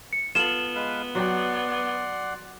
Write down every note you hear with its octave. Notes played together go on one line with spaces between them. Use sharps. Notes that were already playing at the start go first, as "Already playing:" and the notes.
C#7
B3 F4 A4 E7 F#7
G#3 B4 F5
F#3 F#4 D5 F#5 G5 C6